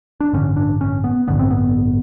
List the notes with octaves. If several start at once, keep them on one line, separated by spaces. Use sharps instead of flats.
D4
A1 G2 D3 C#4
D4
C#4
B3
A1 G2 D3 B3
C4
B3